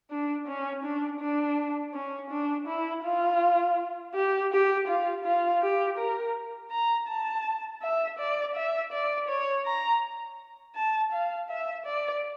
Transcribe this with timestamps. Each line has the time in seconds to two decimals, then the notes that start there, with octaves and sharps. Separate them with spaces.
0.10 D4
0.47 C#4
0.83 D4
1.20 D4
1.94 C#4
2.30 D4
2.67 E4
3.04 F4
4.14 G4
4.52 G4
4.87 F4
5.24 F4
5.62 G4
5.98 A#4
6.71 A#5
7.08 A5
7.82 E5
8.19 D5
8.56 E5
8.92 D5
9.28 C#5
9.66 A#5
10.75 A5
11.12 F5
11.50 E5
11.86 D5